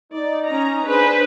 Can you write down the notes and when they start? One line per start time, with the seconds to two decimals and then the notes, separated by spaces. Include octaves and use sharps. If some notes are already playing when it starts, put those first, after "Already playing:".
0.13 D#4 D5
0.47 C#4 A#5
0.86 D4 G#4 B4 C5